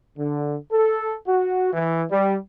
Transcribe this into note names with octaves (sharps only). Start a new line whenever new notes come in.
D3
A4
F#4
E3
G3